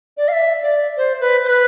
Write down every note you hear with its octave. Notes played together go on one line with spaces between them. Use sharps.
D5
F5
E5
D5
C5
B4
C5
B4